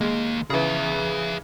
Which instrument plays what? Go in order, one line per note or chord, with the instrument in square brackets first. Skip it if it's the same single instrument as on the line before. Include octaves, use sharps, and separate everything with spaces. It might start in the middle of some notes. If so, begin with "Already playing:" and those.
[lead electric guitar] D#2 A#3 [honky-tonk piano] G#3
[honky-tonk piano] C#3 E3 [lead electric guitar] G#4 E5